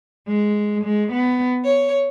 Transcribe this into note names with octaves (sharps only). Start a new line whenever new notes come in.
G#3
G#3
B3
C#5